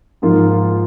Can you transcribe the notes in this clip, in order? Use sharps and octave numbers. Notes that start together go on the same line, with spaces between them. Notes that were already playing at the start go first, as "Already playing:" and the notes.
G#2 F3 A#3 F4